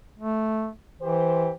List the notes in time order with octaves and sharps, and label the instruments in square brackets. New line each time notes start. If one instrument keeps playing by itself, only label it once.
[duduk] A3
[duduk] E3 [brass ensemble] G4 C5